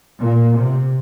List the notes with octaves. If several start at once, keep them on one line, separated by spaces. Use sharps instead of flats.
A#2
C3